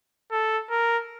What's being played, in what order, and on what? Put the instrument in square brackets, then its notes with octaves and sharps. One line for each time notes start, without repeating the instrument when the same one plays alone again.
[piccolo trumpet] A4
A#4